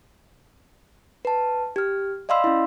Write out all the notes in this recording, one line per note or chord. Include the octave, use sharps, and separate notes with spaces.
B4 A5
G4 F6
D5 D#5 F5 B5 C6 E6
C#4 E4